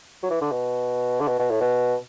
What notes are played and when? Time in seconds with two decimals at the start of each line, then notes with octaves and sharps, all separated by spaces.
0.23 F#3
0.30 E3
0.41 D3
0.52 B2
1.21 D3
1.28 B2
1.40 B2
1.50 A2
1.61 B2